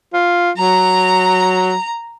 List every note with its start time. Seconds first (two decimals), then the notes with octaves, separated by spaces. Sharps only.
0.14 F4
0.58 F#3 A#5